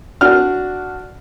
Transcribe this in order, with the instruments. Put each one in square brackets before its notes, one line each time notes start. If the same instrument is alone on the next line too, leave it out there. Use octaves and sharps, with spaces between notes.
[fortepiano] D4 F#4 F6